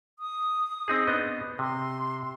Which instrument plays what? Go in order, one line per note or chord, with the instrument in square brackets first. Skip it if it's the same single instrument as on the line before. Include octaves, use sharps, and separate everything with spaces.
[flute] D#6
[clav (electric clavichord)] C4 D#4 G#4
B3 D4 D#5
[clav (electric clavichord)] C3 [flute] C6